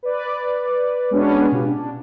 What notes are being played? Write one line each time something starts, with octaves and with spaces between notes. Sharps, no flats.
B4 D5
G#3 B3 C#4 D4 F#4 B4
B2 F4 G4
D4